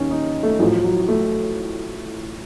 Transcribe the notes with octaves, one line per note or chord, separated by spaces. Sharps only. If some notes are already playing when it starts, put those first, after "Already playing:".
Already playing: D#2 D#3 C#4
D#4
A3
A1 A2 F3 F#3
F#3
A3